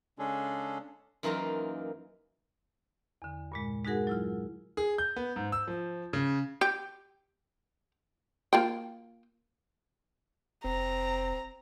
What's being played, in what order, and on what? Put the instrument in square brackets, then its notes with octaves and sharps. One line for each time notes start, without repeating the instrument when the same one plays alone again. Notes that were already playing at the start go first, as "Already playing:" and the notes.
[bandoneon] C#3 G#3 C#4 D4 G#4 A4
[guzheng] F#2 E3 A#3 D#4 F4 A#5
[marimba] E2 D3
G2 A#2 G#3
G#3 D#4 F#4 G#4 A#4 F#5
F#3 E4 F4
[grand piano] G#4
G6
B3
G#2
E6
F3
C#3
[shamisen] G4
A#3 F4 G5
[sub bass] F1 [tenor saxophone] C4 [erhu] A#5